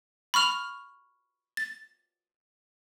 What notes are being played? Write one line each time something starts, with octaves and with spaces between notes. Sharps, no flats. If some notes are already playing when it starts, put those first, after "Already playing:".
B5 C#6 F6 F7
A6